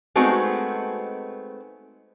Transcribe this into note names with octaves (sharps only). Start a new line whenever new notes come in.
G#3 A3 B3 C4 D#4 F#4